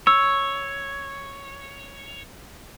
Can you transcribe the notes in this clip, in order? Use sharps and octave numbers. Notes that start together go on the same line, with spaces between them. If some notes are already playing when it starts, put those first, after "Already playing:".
C#5 E6